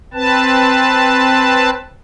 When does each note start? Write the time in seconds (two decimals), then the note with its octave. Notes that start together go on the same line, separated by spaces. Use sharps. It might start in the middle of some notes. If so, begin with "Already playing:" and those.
0.14 C4 B4 A5